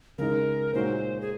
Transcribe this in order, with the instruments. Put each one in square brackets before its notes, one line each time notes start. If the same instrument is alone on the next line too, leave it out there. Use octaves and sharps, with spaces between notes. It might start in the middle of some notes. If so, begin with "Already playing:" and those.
[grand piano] C#3 G#3 D#4 [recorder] A#4
[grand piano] A#2 G#3 D#4 F#4 C#5 [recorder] C5
[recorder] G#4